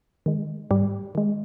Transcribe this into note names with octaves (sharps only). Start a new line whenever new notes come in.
D#3 G#3
G#2 G3 G4
D#3 G#3